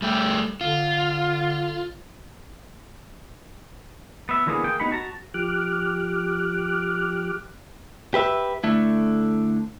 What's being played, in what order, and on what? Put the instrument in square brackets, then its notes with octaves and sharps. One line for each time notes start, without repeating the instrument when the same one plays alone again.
[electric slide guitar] G3 A3 G4
[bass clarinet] D3 [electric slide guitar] F4
[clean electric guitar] B3 E5
D3 E3 G3 A#3 B3 G#4
A#3 G#4 G5
B3 D#4 G4 F#5 B5
F#4 A5 A#5
[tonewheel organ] F3 G4 D6 F6 F#6
[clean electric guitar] G4 B4 E5
D3 A3 E4